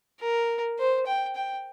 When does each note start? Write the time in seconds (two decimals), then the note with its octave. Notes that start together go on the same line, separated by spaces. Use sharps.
0.20 A#4
0.79 C5
1.06 G5
1.35 G5